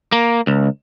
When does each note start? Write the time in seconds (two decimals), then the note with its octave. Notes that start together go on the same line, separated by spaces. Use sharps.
0.12 A#3
0.47 C#2